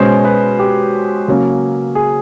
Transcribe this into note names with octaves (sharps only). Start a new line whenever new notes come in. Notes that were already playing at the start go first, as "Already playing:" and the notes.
Already playing: B2 G#3 C#4 C5
B4
G4
C#3 F#3 A#3 C#4
G#4